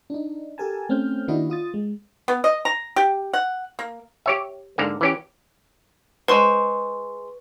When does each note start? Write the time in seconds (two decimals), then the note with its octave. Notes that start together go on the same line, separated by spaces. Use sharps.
0.10 D4 D#4
0.58 G4 A4 A#4 G#5 A5
0.89 A3 C4 C#4 F6 G6
1.28 D#3 A#3 D4 E4 F#4 D#5
1.50 F4 D#6 A6
1.74 G#3
2.28 B3
2.44 D#5
2.65 A#5
2.96 G4
3.33 F#5
3.79 A#3
4.26 G4 C#5 E5
4.78 G#2 D3 A#3
5.01 E3 C#4 G4
6.28 G#3 B4 C5 C#6